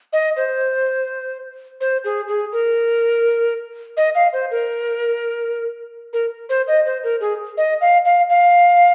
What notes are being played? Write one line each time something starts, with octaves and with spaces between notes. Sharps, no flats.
D#5
C5
C5
G#4
G#4
A#4
D#5
F5
C5
A#4
A#4
C5
D#5
C5
A#4
G#4
D#5
F5
F5
F5